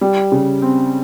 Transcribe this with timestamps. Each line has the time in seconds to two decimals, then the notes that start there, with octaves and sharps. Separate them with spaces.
0.01 G3
0.32 C#3
0.62 C4